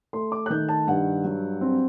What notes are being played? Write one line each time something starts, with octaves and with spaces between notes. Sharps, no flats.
A3 C6
D6
F#6
D#3 G6
A5
G2 F#5
F#3
C4